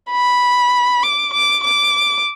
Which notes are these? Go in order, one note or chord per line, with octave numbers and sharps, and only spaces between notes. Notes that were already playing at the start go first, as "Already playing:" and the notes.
B5
D6
D6
D6